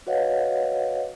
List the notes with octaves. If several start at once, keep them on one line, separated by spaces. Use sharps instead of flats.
F#4 B4 C#5 D#5 F5 F#5